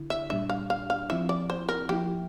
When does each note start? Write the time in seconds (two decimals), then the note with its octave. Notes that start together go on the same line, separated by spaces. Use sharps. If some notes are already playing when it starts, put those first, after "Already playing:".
Already playing: D3 E4
0.10 E5
0.30 A#2 G3 D4 E5
0.49 F5
0.70 F5
0.90 F5
1.10 F3 C4 E4 E5
1.29 D5
1.50 C5
1.69 A#4
1.89 F3 A#3 E4 G4